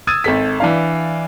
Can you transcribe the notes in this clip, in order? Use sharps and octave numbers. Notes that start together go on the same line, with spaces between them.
D#6 E6 G#6 A6 D#7
G#1 A4 B6
E3 D4 F5